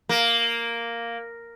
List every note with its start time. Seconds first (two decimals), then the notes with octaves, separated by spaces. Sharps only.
0.09 A#3